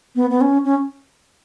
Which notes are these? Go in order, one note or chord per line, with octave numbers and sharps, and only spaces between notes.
B3
B3
C#4
C#4